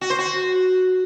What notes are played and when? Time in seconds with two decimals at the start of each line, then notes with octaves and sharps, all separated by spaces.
0.01 F#4
0.10 C5
0.19 F#4